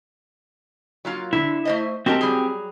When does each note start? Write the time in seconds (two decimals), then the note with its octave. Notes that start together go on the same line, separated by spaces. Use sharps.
1.05 F#3 A#3 F4
1.33 D3 E4
1.65 A3 C5 D#5
2.06 G#3 C4 F#4 G4 A#4 A5
2.21 F#3 G3 G#4